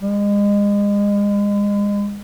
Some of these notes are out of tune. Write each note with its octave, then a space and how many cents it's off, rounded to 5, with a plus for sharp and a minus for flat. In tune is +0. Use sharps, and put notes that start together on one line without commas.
G#3 -30